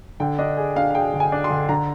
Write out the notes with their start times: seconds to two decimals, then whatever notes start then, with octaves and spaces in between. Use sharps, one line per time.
0.20 D3 G5
0.39 D4 D#5
0.57 G#4
0.76 D4 F5
0.90 F5
0.95 G#4 G5
1.14 D3
1.20 G#5
1.32 D4
1.44 C6
1.50 D3
1.69 D3 A#5